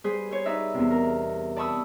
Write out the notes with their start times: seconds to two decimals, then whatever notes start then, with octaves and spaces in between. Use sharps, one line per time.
0.04 G3 G#4 B4 C5
0.31 C5 C#5
0.45 D#4 B4 D5 E5
0.74 E2 C3
0.91 A#4
1.56 D5 A5 B5 C#6 D#6 E6